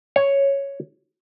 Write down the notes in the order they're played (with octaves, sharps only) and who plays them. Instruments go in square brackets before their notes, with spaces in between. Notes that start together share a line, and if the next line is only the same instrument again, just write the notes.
[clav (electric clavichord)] C#5